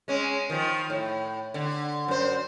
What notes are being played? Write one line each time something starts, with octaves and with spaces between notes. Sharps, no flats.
G#3 C#4
D#3 F3
A2
D3
F#2 C5